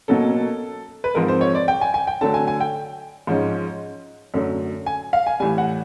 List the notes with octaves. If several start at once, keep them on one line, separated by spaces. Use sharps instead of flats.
B2 F#3 A#3 C#4 A4
B4
G#2 F3 G#3 C4 A#4
C5
C#5
D5
G5
G#5
G#5
G5
D3 F#3 A3 A5
G#5
G#5
G5
G#2 F3 G#3 C#4
F#2 D3 F#3 A3
G#5
F5
G#5
A2 E3 G3 G#5
F#5